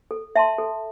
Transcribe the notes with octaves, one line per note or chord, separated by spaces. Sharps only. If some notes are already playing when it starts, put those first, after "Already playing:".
A4
E5 A5 C6
A4